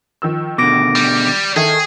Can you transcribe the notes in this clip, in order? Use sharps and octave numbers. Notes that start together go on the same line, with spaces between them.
D#3 F3 E6
B2 D3 D6 A#6 D7
G3
D#3 E4 G#4 A4 G#6